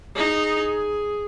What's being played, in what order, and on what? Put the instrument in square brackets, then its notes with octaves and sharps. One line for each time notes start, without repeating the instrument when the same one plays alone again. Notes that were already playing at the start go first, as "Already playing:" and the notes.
[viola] D#4 [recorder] G#4